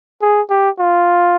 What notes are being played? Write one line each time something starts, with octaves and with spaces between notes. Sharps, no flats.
G#4
G4
F4